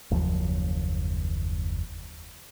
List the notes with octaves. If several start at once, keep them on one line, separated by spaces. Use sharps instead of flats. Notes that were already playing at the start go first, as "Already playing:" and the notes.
F#1 D#2 F3